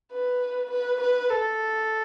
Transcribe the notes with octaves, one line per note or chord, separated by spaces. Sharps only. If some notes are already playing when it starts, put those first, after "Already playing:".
B4
B4
B4
A4